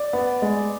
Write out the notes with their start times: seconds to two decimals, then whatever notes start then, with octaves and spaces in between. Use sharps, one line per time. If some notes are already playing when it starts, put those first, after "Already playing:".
Already playing: D5
0.13 B3
0.42 G#3